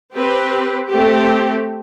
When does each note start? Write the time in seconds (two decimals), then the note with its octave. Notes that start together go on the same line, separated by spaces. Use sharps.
0.14 C4 G4 B4
0.90 A3 C4 G4